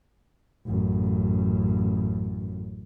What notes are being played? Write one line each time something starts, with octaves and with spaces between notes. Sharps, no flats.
A1 F#2